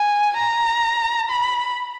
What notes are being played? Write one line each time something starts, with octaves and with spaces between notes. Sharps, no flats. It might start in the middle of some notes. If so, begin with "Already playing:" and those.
Already playing: G#5
A#5
B5